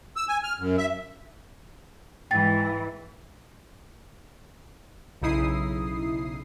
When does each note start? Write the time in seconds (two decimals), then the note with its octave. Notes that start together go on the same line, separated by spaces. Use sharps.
0.16 E6
0.29 G#5
0.43 F6
0.59 F#2
0.78 E5
2.31 G#2 E3 G5 A6
5.22 B1 C#3 D#4 E4 D#6 C7